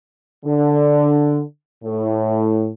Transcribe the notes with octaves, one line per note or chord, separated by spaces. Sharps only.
D3
A2